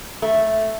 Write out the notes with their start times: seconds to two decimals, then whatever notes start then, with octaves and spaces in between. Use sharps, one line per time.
0.22 A3